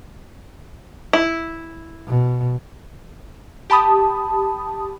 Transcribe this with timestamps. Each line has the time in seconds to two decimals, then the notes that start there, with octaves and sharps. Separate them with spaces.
1.13 E4
2.07 B2
3.70 G4 A5 B5 D#6